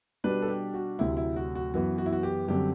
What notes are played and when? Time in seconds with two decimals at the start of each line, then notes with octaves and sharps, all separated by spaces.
0.24 B2 G3 D4 B4
0.42 A4
0.48 G4
0.74 F#4
0.99 D2 C3 F#3 E4
1.17 E4
1.36 F#4
1.55 F#4
1.74 F#2 E3 B3 F#4
1.98 F#4
2.06 E4
2.12 F#4
2.23 G4
2.48 F#2 D3 G3 C4 G4